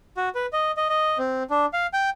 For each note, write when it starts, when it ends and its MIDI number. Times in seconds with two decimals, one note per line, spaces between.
0.17 0.29 66
0.35 0.46 71
0.53 0.72 75
0.77 0.89 75
0.89 1.18 75
1.18 1.43 60
1.50 1.66 62
1.73 1.87 77
1.93 2.10 79